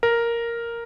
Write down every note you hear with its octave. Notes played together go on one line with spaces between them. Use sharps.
A#4